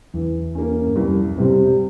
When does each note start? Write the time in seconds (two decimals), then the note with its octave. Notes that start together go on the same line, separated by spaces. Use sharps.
0.14 E2 E3
0.55 A#3 C#4
0.87 G2
0.96 C2 F2
1.37 G#2 C3 G3 C4